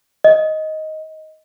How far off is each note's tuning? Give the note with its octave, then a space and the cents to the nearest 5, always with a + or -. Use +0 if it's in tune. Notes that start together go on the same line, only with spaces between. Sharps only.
D#5 +10